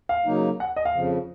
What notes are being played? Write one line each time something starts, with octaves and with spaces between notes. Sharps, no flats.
F5
C#3 F#3 A#3 D#4
F#5
D#5
F5
F2 C#3 F3